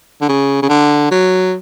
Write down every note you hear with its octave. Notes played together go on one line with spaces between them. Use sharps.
D3
C#3
C#3
D3
F#3